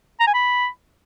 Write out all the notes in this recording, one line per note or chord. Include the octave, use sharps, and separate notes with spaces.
A#5
G#5
B5